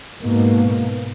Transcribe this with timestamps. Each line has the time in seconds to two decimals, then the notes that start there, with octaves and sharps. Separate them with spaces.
0.22 G#2 B2 A#3